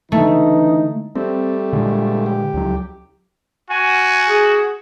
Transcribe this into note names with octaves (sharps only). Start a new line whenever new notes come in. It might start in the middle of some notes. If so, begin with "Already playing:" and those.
D3 E3 A3 D#4
G3 A3 C4
A#2 D3 G#3
G4
C#2 F#3
F#4 G#5
G#4